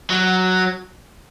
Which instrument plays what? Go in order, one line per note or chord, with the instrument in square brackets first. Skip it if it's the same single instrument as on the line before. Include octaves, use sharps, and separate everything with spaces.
[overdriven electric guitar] F#3